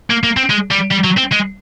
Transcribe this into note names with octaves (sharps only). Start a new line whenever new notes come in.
A#3
A#3
C4
G#3
G3
G3
F#3
C4
G#3